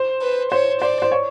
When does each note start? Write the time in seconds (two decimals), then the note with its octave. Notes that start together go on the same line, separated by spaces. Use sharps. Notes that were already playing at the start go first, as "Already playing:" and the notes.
Already playing: C5
0.22 B4
0.52 C5 C#5
0.81 C5 D5
1.02 C5
1.12 C#5